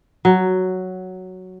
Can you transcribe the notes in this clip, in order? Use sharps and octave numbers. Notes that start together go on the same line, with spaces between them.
F#3